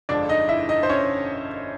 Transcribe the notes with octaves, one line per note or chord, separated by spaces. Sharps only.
G1 F2 D3 F3 G#3 D4 D5
D#4 D#5
E4 E5
D#4 D#5
C5
C#4 C#5